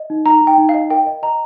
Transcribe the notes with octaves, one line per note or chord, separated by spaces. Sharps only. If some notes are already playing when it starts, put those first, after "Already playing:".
Already playing: D#5
D#4
D#4 A#5
D#4
G5
D#4
F5
D#5
A#4 G5
D#5
D#5 A#5